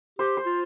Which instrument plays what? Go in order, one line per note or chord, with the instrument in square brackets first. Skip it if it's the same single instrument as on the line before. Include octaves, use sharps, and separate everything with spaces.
[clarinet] G4 [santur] C5
[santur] C5
[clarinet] F4